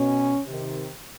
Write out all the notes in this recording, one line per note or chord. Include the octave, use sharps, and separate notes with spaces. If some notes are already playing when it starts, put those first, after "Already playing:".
Already playing: B2 C#4
C3 D#3